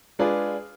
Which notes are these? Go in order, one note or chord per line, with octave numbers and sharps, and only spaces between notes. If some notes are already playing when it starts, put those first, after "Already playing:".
G#3 D4 F4 G#4 B4